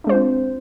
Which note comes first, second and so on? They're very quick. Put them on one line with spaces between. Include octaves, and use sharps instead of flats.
D4 G#3 C5 F4 C4